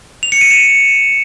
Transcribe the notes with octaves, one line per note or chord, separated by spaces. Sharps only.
F7
C#7
D#7
E7